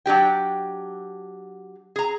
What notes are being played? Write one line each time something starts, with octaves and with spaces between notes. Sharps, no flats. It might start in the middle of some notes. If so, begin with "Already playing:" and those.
F#3 D4 G4 G5
G#4 A#5